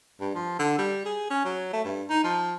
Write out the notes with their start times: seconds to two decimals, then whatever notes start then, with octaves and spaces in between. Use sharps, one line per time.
0.21 G2
0.35 F3
0.59 D3
0.79 G3
1.06 G#4
1.30 C#4
1.45 F#3
1.73 A3
1.85 G2
2.10 D#4
2.24 F3